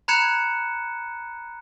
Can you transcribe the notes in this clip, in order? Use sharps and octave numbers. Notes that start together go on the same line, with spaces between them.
A#5 B5 F#6 G#6 C#7 E7